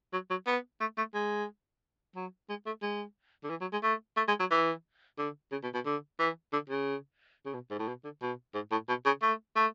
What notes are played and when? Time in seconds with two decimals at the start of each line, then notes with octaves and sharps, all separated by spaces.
0.13 F#3
0.30 F#3
0.47 B3
0.80 A3
0.98 A3
1.14 G#3
2.16 F#3
2.49 G#3
2.66 A3
2.82 G#3
3.44 D3
3.50 E3
3.61 F#3
3.72 G#3
3.83 A3
4.17 A3
4.28 G#3
4.40 F#3
4.51 E3
5.18 D3
5.52 C#3
5.63 B2
5.74 B2
5.86 D3
6.19 E3
6.53 D3
6.70 C#3
7.46 C#3
7.54 B2
7.71 G#2
7.79 A2
7.88 B2
8.04 D3
8.22 B2
8.54 G#2
8.71 A2
8.89 B2
9.06 C#3
9.22 A3
9.56 A3